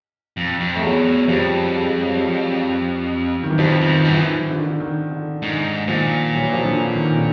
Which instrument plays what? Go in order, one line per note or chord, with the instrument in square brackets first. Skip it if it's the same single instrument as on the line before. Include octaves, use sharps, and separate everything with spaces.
[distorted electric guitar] F2
F2
[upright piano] A3
[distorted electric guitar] E2 [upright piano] F#3 G#3
[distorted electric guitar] F2 [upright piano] F3 G3
[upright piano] G#3
G3
F#3
F3 G3
D#3
E3
[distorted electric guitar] F2 [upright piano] D#3 F3
[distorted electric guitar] F2
[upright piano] D#3
[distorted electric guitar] F#2 [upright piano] E3
[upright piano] D#3
D3
D#3
D3
D#3
D3
[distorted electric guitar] G#2 [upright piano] D#3
[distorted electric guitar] A#2 [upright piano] D#3 F3
[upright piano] E3 F#3
F3
D3 E3
D#3
D3